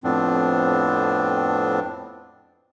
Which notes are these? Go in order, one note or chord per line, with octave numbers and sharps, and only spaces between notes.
F2 A2 F3 B3 C4 D4